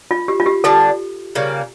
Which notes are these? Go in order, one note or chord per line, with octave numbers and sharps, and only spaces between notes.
F4
G4
F4
G4
D3 G3 D4 A4
C#3 G3 A#3